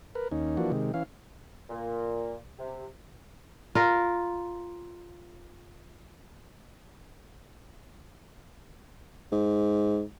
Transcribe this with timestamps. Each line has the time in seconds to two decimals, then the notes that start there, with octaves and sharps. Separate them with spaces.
0.15 A#4 B4
0.32 D#2 C#4 D#4
0.57 E3 F3 A#3 D4 F#4
0.72 C3 D#3 G#3
0.94 E3 C#4 F5
1.70 A#2
2.58 C3
3.75 F4 A#4
9.32 G#2